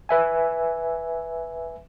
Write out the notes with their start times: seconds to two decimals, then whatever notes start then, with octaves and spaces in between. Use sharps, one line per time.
0.09 B4 E5 G#5